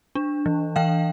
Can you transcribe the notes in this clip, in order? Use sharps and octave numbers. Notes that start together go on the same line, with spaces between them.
D4
E3
E3 F5 G5